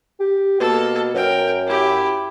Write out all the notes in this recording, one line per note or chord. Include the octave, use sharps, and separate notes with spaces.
G4
B2 A#3 A4
F#2 A#4 G5
E4 G4